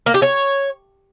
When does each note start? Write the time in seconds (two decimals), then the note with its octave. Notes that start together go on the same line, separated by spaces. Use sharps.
0.06 A#3
0.14 G4
0.22 C#5